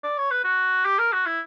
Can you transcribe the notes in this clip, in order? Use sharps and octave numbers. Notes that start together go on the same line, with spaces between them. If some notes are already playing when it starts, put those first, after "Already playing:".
D5
C#5
B4
F#4
G4
A#4
F#4
E4